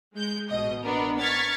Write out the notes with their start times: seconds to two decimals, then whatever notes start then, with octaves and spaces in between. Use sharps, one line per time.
0.14 G#3 G6
0.49 A1 B2 D#5
0.83 B3 D4 A#4
1.20 C#6 F6 G#6 A6 B6